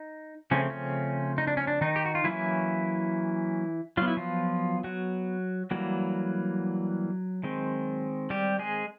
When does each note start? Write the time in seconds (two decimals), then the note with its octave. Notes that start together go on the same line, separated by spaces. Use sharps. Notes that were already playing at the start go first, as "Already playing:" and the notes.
Already playing: D#4
0.51 C#3 F3 A3 C4 C#4
0.70 C#4
1.38 D#4
1.47 D4
1.57 C#4
1.67 D4
1.81 D#3 D#4
1.96 G4
2.06 F#4
2.15 F4
2.24 E3 F#3 A#3 C#4 E4
3.97 F#3 B3 F4
4.08 E4
4.17 F3 F4
4.84 F#3 F#4
5.71 E3 F#3 G3 A#3 F#4
7.44 D#3 G#3 C4
8.30 G3 G4
8.59 G#3 G#4